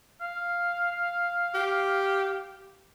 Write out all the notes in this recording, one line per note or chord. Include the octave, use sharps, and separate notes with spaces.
F5
G4